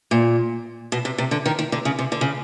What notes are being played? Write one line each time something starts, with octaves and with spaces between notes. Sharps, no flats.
A#2
B2
C3
C3
D3
D#3
D#3
D3
C#3
C3
D3
C#3